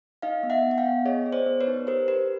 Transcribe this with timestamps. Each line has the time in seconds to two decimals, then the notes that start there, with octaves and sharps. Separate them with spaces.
0.22 D#4 D#5 F5
0.43 B3
0.50 E5 F#5
0.64 B3
0.71 F#5
0.77 F5 G5
0.85 B3
1.05 G#4 C#5 D#5
1.26 G#4
1.32 C5 D5
1.46 B3
1.61 B4 C#5
1.67 D#4
1.87 G4 A#4 C5
2.08 G4 B4